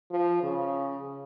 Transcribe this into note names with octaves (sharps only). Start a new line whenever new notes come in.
F3
C#3